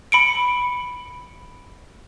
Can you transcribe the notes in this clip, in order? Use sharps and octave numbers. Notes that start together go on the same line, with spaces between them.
B5 C#7 D7